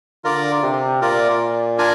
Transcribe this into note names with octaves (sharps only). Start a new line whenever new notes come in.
D3 F4 A#4 D5
C3
A#2 F4 A#4 D5
D4 F4 A#4 D5 G#5